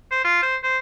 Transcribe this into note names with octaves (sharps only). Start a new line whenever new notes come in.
C5
F4
C5
C5